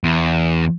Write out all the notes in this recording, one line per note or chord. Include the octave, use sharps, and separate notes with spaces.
E2